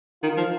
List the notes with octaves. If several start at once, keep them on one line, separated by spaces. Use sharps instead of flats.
D#3 F4
F3